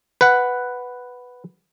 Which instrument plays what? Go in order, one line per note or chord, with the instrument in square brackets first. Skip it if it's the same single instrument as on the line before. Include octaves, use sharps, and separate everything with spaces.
[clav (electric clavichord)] B4 F#5